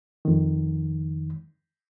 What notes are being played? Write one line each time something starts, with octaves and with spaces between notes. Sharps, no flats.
F2 D#3